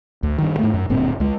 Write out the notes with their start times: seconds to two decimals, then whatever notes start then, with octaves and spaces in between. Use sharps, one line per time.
0.23 D2
0.38 G2 D#3
0.59 G#2 A3
0.74 F#2
0.90 D1 G2 A#2 C4
1.20 C#2 G#3